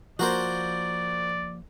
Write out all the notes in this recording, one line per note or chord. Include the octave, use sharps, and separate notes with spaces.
F3 A#3 F#4 A#4 C5 D5